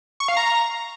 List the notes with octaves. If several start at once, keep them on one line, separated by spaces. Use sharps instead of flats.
C#6
F5
A#5